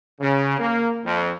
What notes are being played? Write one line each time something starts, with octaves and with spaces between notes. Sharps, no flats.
C#3
A#3
F2